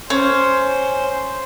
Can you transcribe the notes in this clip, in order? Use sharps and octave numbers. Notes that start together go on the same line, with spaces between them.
C#4 C5